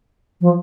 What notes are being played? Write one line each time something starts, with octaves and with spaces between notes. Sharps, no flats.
F3